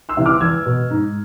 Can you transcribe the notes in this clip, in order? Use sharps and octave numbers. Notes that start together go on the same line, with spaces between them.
C6 E6
C3 E3
D6 F6
E2 E6 G#6
B2
G#2